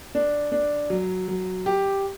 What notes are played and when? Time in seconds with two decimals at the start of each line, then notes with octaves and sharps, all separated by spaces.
0.15 D4
0.52 D4
0.90 F#3
1.28 F#3
1.66 G4